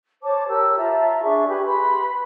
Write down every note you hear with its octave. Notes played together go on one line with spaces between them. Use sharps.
C5 C#5 A5 D6
G4 A#4 C#5 E6
F4 E5 A5 A#5
D4 G#4 E5 C#6
G4 B4 G#5 B5
B4 B5 C6